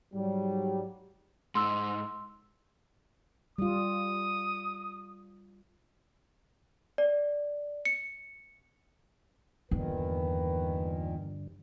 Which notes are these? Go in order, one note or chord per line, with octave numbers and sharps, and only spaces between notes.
G#2 F#3 G3
G#2 C6 E6
G3 F4 D#6
D5
C#7
E2 G2 A#2 D3 D#3 B4